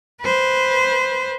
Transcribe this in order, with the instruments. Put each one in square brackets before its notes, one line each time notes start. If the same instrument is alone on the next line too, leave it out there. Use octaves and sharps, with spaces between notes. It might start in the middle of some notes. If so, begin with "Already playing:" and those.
[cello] B4 C5